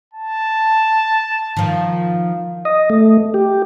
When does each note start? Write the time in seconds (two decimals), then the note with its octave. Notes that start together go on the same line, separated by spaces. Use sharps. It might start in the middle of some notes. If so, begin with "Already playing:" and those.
0.14 A5
1.57 D#3 F3
2.65 D#5
2.90 A3
3.34 G4